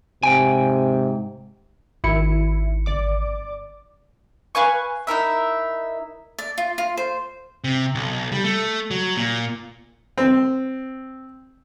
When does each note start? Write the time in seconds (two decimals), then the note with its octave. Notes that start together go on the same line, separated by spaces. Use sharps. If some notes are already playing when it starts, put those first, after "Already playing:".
0.23 G#2 C3 G5 G#5
2.04 G#1 D#3 E4 C#7
2.86 G1 D5 D6
4.55 B4 F5 G#5 C#6
5.07 D#4 E4 A#4 E5
6.38 D5
6.58 F4
6.78 F4
6.97 C5
7.64 C3
7.95 B1
8.32 G3
8.44 A3
8.91 F#3
9.16 A#2
10.18 C4